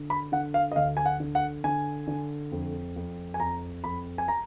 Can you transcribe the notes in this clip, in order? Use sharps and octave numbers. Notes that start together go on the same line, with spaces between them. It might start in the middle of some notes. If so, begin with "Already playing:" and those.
Already playing: D3
B5
D3 F#5
F5
D#5
D2 F5
G#5
F#5
D3
F#5
D3 G#5
D3
F2
F2
G#5
F2 A#5
F2 B5
G#5
A#5